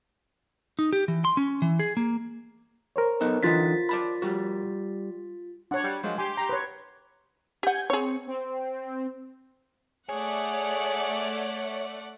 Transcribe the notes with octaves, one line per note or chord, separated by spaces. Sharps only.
D#4
G4
E3
C6
C#4
E3
G#4
A#3
A#4 C5 C#5
B3 D#4 A4
D3 E3 D#4 F4 A6 B6
D5 A5 B5
G3 F#4
D4 C#5 F#5
G3
F3 F#3 G#3 A#3
G4 G#5 C6
A#5
B4 C#5
G4 F#5 G#5 G6 G#6
C4 G#4 C#5 C#7
C4
A3 G#4 C#5 D5 F#5